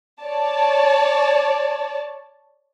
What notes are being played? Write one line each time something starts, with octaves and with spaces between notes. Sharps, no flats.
C#5 D5 A5